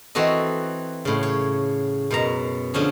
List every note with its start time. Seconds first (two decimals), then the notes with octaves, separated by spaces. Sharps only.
0.15 E3 C4 F#4 A4 D#5
1.05 A2 C#3
1.23 C#5
2.11 F#2 B2 A#5
2.74 D3 F3 C#4 G#4